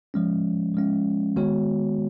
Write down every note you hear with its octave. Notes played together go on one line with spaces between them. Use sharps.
F3 G#3 C#4
F3 G#3 C#4
D#3 G#3 B3 F#4 C#5